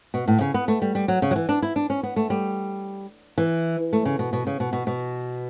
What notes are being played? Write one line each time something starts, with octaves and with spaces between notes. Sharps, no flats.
B2
A2
C#3
B3
A3
G3
G3
F#3
C#3
F#3
E3
D4
E4
D4
C#4
B3
A3
G3
E3
A3
C#3
B2
B2
C#3
B2
B2
B2